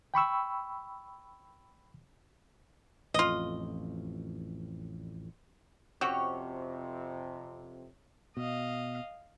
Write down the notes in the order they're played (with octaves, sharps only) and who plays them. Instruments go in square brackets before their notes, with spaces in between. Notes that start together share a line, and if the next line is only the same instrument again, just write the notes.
[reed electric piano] G5 B5 C#6 E6
[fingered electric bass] A1 F2 [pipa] F4 D#5
[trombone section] F2 C3 [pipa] C4 F#4 G4 [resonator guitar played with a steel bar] C#4 C#5
[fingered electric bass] B2 [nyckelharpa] D#5 F5